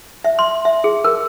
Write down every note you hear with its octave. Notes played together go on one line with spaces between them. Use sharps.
E5
C6
E5
G#4
A#4